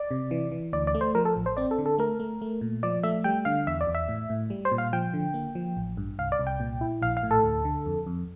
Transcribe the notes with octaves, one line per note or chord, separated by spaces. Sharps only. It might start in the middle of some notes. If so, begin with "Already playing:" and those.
Already playing: D5
C3
E3
E3
D2 D5
D5
A3
C5
F3 A#4
A4
A1
C5
C4 D5
A4
D3
A4
A3 A#4
A3
A3
A#2
F3 D5
A3 E5
G3 G5
D3 F5
E2 E5
D5
E2
E5
A2
A2
G3
C5
A#2
F5
F3 G5
D3
A#3
F3
A1
G2
C2 F5
D5
C2
G5
A#2
E4
A#1 F5
F5
A2
A4
D2
D3
F2
F2